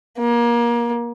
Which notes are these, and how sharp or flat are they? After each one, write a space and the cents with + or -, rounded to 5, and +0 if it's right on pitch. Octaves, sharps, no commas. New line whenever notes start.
A#3 +25